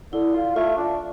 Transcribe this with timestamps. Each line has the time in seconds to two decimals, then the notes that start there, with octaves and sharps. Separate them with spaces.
0.12 D3 E4
0.34 F4
0.56 A3 F4
0.77 D4